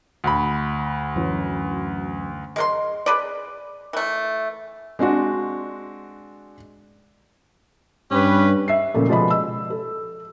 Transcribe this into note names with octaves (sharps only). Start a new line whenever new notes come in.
D2 B5
F#2 E3 F#3
G#3 A#4 C6
G#4 B4 D5
E3 A3
G#3 C4 D4 F#4
G2 C#4 G4 B4
E5 C7
A#2 C#3 F3 A3 A#3
B2 F3 G#3 D5 D#5 B5
E6
A4